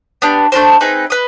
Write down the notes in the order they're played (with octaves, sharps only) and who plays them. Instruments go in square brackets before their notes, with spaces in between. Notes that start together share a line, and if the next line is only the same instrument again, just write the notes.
[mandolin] B3 D4 G4
A3 D4 G4 C5
C4 D#4 G#4 B4
B4 D#5